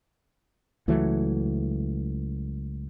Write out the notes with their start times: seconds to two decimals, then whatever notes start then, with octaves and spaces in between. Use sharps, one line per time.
0.88 C#2 E3 F#3 A3